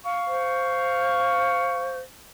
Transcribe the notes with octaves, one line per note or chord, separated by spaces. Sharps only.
F5 C#6
C5